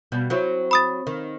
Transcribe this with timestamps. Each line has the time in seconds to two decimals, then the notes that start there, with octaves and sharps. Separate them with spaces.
0.12 B2 G3
0.30 F#3 C4 E4
0.71 B5 D#6 A6
1.07 D#3